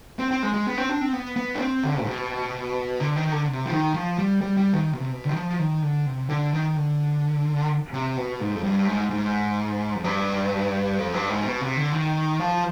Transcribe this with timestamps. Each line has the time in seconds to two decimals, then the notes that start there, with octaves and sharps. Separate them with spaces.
0.19 C4
0.31 C4
0.43 G#3
0.54 G#3
0.67 B3
0.78 C4
0.89 D4
1.01 C4
1.13 B3
1.36 B3
1.54 D4
1.60 C4
1.83 D3
2.01 G#2
2.07 B2
3.00 D3
3.16 D#3
3.32 D3
3.48 C3
3.66 F3
3.71 D#3
3.94 F3
4.18 G3
4.41 G3
4.57 G3
4.73 D#3
4.93 B2
5.00 C3
5.12 B2
5.24 D3
5.30 D#3
5.35 F3
5.59 D#3
5.82 D3
6.06 C3
6.29 D3
6.53 D#3
6.76 D3
7.93 C3
8.17 B2
8.40 G#2
8.55 F2
8.64 G2
8.87 G#2
9.10 G#2
9.96 F2
10.04 G2
10.99 F2
11.14 G2
11.29 G#2
11.45 B2
11.61 C3
11.77 D3
11.92 D#3
12.39 F3